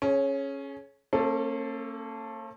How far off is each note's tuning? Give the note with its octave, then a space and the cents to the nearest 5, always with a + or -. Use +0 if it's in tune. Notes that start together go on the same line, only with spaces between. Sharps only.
C#4 -10 G#4 +30
A#3 -40 C#4 -45 A4 +0